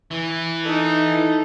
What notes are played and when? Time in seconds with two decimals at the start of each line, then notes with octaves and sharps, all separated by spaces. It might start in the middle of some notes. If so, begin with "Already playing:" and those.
0.11 E3
0.63 D#4 A4